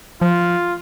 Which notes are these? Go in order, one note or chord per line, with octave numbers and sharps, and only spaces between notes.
F3 F4